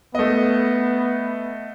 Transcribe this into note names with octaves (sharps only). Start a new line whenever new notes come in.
A3 B3 D#5